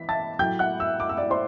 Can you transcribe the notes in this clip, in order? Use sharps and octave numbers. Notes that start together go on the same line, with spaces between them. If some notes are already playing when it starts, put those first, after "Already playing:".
Already playing: E3 B6
A5 A6
A2 F#3 G5 G6
F#5 F#6
E5 E6
D6
E6
D5 D6
C5 C6